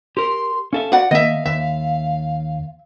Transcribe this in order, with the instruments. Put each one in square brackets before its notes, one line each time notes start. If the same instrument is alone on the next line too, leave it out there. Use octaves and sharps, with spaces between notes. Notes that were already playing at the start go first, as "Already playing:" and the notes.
[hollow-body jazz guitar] G4 A#4 [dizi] C6
[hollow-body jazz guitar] C#4 A4 E5 [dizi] F5
[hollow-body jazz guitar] F#4 [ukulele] D5 F#5 [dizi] F5
[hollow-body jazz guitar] D#3 A#3 [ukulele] D#5 E5
[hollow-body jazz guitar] D#2 [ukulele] E5